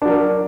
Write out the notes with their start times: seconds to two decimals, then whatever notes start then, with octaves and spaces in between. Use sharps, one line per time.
0.02 D4
0.05 F#3
0.09 A#4